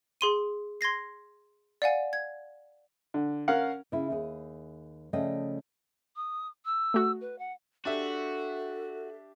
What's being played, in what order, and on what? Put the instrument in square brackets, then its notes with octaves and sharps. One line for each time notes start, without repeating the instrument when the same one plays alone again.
[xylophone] G#4 C6 D#7
C6 G#6 A#6 C7
D5 F5 F#5 G#5
G#6
[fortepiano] D3
C#4 A#4 F5 F#5
[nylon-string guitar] C#3 E4
D#2 G#4
C#3 F3 A3 D5 D#5 G5
[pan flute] D#6
E6
[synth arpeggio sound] A3 F#4
[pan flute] B4
F#5
[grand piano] D4 G4 E5 [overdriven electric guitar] F#4 [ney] A4